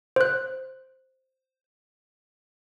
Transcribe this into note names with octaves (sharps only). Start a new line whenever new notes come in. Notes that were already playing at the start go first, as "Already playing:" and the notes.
C5 F#6